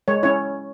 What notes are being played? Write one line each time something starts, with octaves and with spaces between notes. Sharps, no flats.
G#3 C#5
C#4 E4 C#5